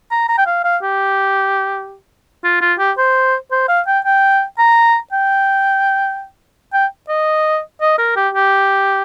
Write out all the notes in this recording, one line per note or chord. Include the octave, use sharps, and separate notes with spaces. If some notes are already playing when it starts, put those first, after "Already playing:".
A#5
A#5
G5
F5
F5
G4
F4
F4
G4
C5
C5
F5
G5
G5
A#5
G5
G5
D#5
D#5
A#4
G4
G4